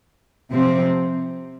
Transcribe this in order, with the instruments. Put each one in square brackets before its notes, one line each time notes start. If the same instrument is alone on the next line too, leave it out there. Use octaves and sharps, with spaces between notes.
[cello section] C3 F3 C4